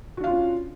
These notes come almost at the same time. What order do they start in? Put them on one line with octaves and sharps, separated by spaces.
F#4 D4 F5 F4 C#4